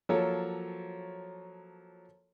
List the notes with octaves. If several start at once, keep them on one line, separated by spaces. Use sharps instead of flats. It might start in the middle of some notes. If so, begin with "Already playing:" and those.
F3 F#3 A#3 A4 C#5